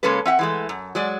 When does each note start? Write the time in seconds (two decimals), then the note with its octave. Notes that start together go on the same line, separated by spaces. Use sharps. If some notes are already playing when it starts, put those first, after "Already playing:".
0.03 C#3 G#3 A#3 C#4 A4 B4
0.26 C4 E5 F#5
0.39 E3 G#3 A3
0.69 F#2
0.95 F#3 G#3 D5